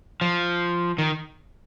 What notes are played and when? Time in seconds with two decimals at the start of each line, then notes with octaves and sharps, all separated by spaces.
0.21 F3
0.98 D#3